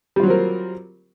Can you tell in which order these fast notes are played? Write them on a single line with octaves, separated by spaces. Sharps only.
G3 F4 F#3 C4 A#4